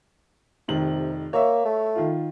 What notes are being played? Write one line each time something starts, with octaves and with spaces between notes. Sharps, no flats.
F1 C3 D#3 F#7
A#3 C#5 E5
A3
D#3 F4